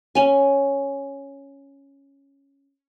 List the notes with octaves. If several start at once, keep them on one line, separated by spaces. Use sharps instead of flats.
C#4 G#5